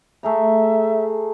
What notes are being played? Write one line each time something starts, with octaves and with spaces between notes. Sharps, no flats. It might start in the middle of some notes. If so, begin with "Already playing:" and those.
A3 G#4 E5 A#5